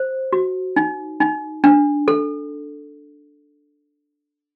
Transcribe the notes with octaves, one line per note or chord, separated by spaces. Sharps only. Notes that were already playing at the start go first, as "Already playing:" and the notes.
Already playing: C5
F#4
D#4
D#4
D4
A4